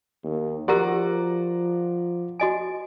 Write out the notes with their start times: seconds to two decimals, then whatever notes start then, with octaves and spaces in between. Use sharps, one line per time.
0.24 D#2
0.68 F3 F#4 G4 A#4 D5 F#5 A#5
2.40 F#4 D#5 G#5